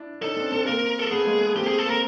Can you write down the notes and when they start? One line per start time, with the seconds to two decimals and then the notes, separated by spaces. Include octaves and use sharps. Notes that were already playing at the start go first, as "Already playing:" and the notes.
Already playing: D4 E4
0.22 C#4 D#4 A4
0.32 C#4
0.36 C4 D4
0.52 C4 D4
0.66 A#3 C4 A#4
0.99 A4
1.11 A3 B3 G#4
1.26 G#3 A#3
1.41 A3 B3
1.56 A#3 C4 G4
1.67 G#4
1.78 A4
1.85 A#3 C4 A#4